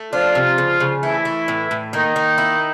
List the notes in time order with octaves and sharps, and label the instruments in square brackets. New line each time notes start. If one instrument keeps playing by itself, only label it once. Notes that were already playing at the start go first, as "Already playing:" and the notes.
Already playing: [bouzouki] A3
[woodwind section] F3 F4 [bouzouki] D4
[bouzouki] C3
C#3
C#3
[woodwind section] E3 E4 [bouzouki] A3
[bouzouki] A3
A2
A2
[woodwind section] D#3 D#4 [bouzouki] A#3
[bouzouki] A#3
E4